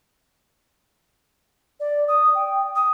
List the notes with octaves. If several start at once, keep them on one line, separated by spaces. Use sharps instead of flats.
D5
D#6
G5
D#6